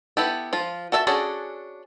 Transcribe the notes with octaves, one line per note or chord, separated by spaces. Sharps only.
B3 E4 G4 A4
F3 F4
F#4 A4 E5 F5 A5
C#4 D4 F#4 G#4 A4